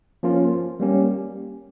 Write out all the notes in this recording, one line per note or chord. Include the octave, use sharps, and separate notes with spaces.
F3 A#3 C#4 F4
G3 A#3 C#4 G4